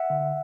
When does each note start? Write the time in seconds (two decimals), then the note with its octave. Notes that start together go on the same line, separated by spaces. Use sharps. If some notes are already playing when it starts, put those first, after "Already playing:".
Already playing: E5 F#5
0.10 D3